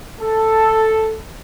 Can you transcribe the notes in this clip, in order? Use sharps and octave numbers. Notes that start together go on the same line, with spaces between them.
A4